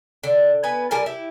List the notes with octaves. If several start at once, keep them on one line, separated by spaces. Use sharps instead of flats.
D3
B3 B4 G#5
G3 A#4 G#5 A5
E4 G4